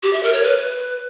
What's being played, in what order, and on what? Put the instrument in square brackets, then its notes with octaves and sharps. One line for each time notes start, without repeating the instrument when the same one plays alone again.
[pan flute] G4
E5
A#4
C#5
B4